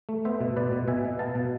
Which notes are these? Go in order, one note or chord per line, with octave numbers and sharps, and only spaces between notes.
A3
B3 C5 E5
B2
B2 B4 D5
B2
B2 E5 G#5
B2
B3 F5 A5
B2